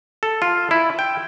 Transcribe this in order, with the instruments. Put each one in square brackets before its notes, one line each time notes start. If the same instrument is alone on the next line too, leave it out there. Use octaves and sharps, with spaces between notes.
[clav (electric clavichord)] A4
F4
E4
G5